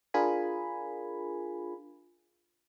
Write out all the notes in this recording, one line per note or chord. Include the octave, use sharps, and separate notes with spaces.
D4 F4 G#4 A#4 G#5 B5